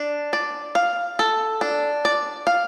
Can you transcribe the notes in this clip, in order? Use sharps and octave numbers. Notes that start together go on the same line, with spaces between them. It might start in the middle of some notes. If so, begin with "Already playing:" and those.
Already playing: D4
D5
F5
A4
D4
D5
F5